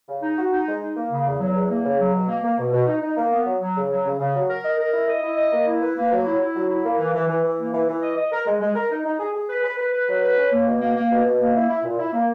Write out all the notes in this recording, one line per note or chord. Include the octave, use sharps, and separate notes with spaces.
C#3
D#4
F#4
D#4
G#3
D#4
A#3
C#3
E2
F#3
E2
A#3
C#3
F#3
B2
A#3
A#3
B2
B2
D#4
D#4
A#3
B3
F#3
F#3
C#3
F#3
C#3
C#3
F#3
A#4
D#5
A#4
E4
D#5
E4
D#5
A#3
E4
B4
A#3
F#3
E4
E4
F#3
E4
A#3
E3
E3
E3
E3
A#3
E3
E3
D#5
D#5
A#4
G#3
G#3
A#4
D#4
D#4
G#4
G#4
B4
B4
B4
B4
F#3
B4
C#4
A#3
B2
A#3
A#3
B2
B2
A#3
E4
E4
A#2
E4
A#3